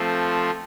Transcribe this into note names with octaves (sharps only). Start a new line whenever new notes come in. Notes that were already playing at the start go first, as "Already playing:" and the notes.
Already playing: F3 A3 C4 F4